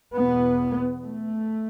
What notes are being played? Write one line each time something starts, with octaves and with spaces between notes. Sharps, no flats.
E2 B2 B3
A3